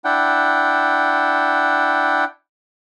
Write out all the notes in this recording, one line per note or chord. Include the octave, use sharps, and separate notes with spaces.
D4 E4 F#5 G5